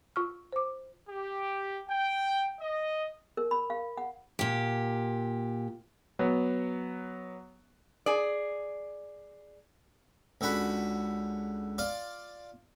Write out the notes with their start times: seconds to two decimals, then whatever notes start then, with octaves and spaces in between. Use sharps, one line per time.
0.16 F4 C#6 F6
0.53 C5 D6
1.09 G4
1.89 G5
2.59 D#5
3.37 A#4
3.51 B5
3.70 F5
3.97 F#5
4.39 A#2 G4
6.19 F#3 B3
8.06 G#4 D5
10.41 C#2 D3 F#4 B5
11.78 F4 D5